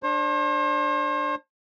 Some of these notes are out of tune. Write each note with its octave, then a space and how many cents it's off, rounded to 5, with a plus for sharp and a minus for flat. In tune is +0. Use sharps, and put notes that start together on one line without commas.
D4 +10 C5 +40